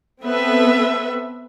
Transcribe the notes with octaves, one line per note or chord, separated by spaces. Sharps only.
B3 C4 A4 B4 E5